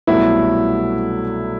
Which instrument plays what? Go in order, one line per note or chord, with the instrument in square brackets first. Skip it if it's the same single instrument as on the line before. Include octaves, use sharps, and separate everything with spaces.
[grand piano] C2 B2 F#3 A3 E4